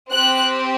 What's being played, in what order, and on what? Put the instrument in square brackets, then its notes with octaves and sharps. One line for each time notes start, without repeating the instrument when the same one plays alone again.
[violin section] C4 G4 F#6